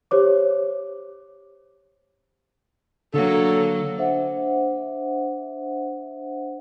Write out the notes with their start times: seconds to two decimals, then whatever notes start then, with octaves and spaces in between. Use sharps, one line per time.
0.11 G4 C5 C#5 D6
3.14 D3 F#3 A#3 A4
3.97 D4 C5 E5 F#5